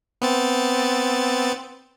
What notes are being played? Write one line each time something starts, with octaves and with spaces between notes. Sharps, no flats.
B3 C4 A6